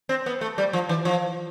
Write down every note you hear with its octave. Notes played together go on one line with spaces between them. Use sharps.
C4
B3
A3
G3
F3
E3
F3